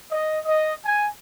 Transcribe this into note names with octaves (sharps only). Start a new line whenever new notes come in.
D#5
D#5
G#5